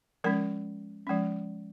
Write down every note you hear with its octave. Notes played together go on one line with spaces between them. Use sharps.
F3 G#3 C#4 A#4
F3 G#3 C#4